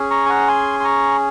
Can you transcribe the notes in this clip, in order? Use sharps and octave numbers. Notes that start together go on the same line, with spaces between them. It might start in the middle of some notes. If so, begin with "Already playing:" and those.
Already playing: C#4 G#4
A#5 C#6
G#5
F#5 A#5
G#5 C6
C6
A#5 C#6